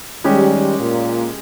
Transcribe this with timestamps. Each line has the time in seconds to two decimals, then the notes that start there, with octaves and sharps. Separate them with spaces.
0.24 D#3 G3 G#3 C#4 G4
0.79 A#2